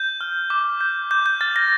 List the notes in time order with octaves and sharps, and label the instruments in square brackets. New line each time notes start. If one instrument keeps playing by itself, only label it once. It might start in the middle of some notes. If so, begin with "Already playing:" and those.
Already playing: [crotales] G6
F6
D6
G6
D6 G6
G6
F6 A6
A#6